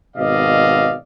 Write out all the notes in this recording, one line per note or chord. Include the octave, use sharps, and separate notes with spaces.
G#1 B2 D5 D#5 F5